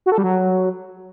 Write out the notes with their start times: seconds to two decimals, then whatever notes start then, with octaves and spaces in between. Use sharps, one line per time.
0.06 F#4
0.12 A4
0.18 G3
0.24 F#3